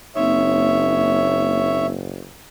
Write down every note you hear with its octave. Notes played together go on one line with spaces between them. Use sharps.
F#1 A#3 C4 D#4 C#5 E5